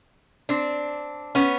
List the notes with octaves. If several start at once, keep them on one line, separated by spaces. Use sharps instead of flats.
C4 D4
B3 C#4